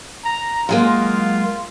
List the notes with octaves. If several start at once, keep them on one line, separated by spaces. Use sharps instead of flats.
A#5
F#3 G#3 A#3 F4